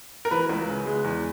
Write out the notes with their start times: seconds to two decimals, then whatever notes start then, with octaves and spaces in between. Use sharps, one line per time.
0.25 A#4
0.31 E3 B4
0.49 C#2
0.68 C#3
0.86 G#3
1.04 E2